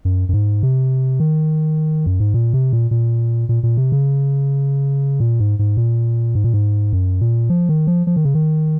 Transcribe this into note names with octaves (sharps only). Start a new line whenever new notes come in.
F#2
F#2
G#2
C3
D#3
F#2
G#2
A#2
C3
A#2
A#2
A#2
A#2
C3
C#3
A#2
G#2
G#2
A#2
G#2
A#2
G#2
F#2
A#2
F3
D#3
F3
F3
D#3
C#3
D#3